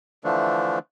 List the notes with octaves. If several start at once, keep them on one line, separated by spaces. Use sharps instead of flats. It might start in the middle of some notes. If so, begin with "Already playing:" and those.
D3 E3 F3 A3 D4